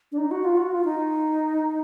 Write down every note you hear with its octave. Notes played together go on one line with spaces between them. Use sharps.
D4
D#4
F#4
F4
F#4
F4
D#4